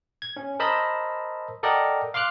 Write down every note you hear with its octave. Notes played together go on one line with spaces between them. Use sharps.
G#6
C#4
A#4 C5 D#5 A5 B5 E6
A4 A#4 D5 D#5 F#5 G5
F5 C6 D6 F6 F#6